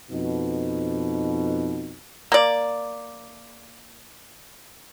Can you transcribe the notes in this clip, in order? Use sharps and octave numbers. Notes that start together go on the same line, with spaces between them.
F2 B2 D#4
A#3 D5